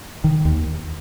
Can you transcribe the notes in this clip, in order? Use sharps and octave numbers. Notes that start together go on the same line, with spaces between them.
D#3
D#2